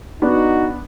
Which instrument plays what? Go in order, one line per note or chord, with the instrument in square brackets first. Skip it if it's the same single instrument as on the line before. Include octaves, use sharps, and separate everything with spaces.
[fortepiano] B3 D4 [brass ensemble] D#4 F#4